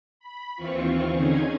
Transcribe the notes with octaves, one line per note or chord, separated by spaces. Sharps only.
B5
D#2 E3 C4 F4 C#6
D3 C#4 D#4 G#4 G#6